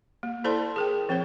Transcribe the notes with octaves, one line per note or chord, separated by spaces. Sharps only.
A#3
E4 A4 C5 D5 A5 C6
G#4 A#4 G5
F3 C4 C5 C#5